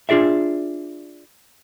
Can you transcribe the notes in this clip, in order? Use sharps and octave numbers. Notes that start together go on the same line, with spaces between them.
D4 F4 G#4 D5 E5